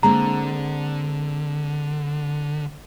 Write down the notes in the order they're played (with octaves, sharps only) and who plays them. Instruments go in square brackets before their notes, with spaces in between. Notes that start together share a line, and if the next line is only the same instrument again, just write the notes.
[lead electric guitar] D3 [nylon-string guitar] G#3 A#3 C4 [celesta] A#5